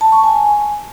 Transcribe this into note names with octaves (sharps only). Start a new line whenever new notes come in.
A5
C#6
G#5